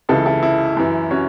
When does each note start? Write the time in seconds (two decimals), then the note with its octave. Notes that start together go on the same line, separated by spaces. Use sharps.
0.09 C#2 C#3 E3 E4 A4
0.26 E4 A4
0.43 E4
0.77 F#2 E3
1.10 C#4 F#4